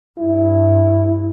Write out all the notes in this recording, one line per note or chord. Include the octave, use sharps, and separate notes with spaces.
G2 E4